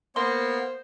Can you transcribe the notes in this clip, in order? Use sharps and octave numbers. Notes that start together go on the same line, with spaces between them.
A#3 B3 C5 C6